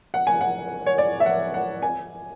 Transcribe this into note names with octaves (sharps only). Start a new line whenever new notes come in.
F#5
G#5
F#5
C#5
D5
E5
F#5
F#5
G#5